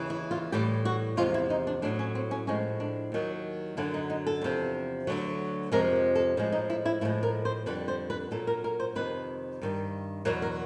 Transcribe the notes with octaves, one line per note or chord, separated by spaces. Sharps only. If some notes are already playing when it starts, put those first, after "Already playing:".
Already playing: D#2 C#3 E3
E4
F4
A2 E3 G3 G4
F#4
E2 C3 F3 G#3 F4
E4
D#4
D4
A2 F#3 D4
C#4
C4
C#4
A2 F3 G#3 C#4
D4
D#2 D#3 F#3
F#2 D3 F#3 E4
D#4
D#4
A4
E2 C3 F3
D2 D3 F#3
F2 C3 F3 G#3 A#4
A4
A2 F3 G#3
D#4
E4
E4
A2 F3 G#3 E4
A#4
C5
F2 D3 G3 B4
C5
B4
A#2 F#3 A4
A#4
A#4
C5
F2 C3 D#3 B4
G2 D#3 G3
E2 B2 F#3 A#4
A#4